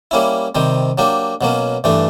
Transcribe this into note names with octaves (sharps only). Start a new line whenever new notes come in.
G3 A#3 C#4 E4
C3 D#3 G3 C4
F#3 A#3 D4 G4
B2 F#3 A#3 C#4
G2 E3 A3 D4